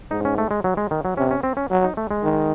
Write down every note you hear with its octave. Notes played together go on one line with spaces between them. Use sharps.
G#2 D#4
C#4
A3
G#3
F#3
G#3
D#3
F#3
C3 C#4
C#4
C4
C#4
F#3
D#4
A3
G#3
D#3